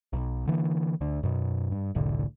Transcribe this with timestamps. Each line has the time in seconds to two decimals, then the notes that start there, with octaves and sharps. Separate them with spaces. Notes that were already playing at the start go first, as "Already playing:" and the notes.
0.13 B1
0.47 D3 E3 A#3
1.01 D2 D3
1.23 F#2 B2
1.72 G2
1.95 F1 C2 A2 D3